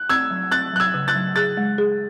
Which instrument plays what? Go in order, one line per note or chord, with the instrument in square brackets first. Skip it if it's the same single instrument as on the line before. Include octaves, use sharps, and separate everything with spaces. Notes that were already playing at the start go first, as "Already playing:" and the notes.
Already playing: [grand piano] F#6
[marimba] C4 [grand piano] E6 G#6
[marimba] F#3
[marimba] C4 [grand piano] F#6 A6
[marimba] F#3 [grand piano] F#6
[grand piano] E6 G#6
[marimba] C#3
[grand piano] F#6 A6
[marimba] F#3
[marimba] G#4 [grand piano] F#6 A6
[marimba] G#3
G#4